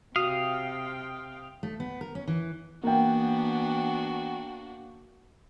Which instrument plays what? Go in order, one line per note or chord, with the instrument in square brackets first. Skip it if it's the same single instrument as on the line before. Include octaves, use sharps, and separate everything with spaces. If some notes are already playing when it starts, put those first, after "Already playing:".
[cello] C3 G5 [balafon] F#4 [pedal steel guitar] F5 [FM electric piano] D#6
[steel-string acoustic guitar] A3
B3
A#4
C#4
E3
[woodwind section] E3 B3 [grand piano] A#3 G5 [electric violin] D4 F#4